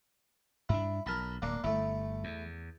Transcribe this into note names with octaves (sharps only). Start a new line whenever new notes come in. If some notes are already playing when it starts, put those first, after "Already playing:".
G2 D4 E4
B1 A#4 A5 B5
D1 A#3 D4
G1 A3 E4
E2